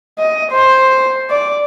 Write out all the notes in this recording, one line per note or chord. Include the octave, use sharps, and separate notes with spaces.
D#5
C5
D5